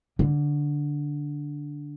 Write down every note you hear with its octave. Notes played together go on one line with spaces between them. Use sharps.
D3